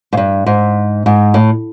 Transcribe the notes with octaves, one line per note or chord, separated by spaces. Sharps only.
G#2
G2
G#2
G#2
A2